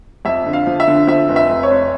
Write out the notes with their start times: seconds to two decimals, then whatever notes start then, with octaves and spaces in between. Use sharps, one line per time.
0.25 F2 E5
0.46 D3
0.53 F5
0.67 F3
0.80 E5
0.87 D3
1.07 F3 E5
1.28 F1
1.36 E5
1.49 F1
1.63 C#5
1.71 F1